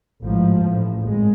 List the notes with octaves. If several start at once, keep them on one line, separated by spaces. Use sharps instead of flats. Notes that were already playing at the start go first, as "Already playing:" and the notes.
A1 G#2 F3
A1 A2
G#1 G#3